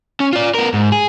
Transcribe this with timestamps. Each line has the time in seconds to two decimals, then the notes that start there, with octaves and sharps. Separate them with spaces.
0.20 C#4
0.33 F4 D5
0.54 B3 A#4
0.74 G#2
0.92 G#4